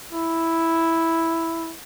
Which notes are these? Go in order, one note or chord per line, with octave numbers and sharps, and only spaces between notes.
E4